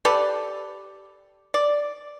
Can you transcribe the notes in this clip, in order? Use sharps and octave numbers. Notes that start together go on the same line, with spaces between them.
G4 A4 B4 D5
D5